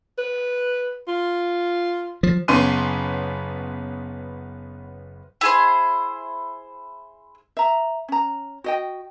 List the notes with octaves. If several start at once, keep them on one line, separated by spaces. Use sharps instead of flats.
B4
F4
F3
F#1 B3 C#4 C6 D#7
E4 G#4 C5
E5 A#5
C#4 A#5
F#4 D#5 G5